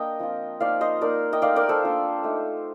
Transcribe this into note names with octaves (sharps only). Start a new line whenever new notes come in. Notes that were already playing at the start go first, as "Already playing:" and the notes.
Already playing: A#3 D4 D#5 G5
F3 C4 F4
F3 A#3 D#4 D5 F5
C5 D#5
A#3 D#4 A#4 D5
D#5 G5
A3 D#4 D5 F5
A#4 D5
A4 C5
A#3 D4 F4
A3 D#4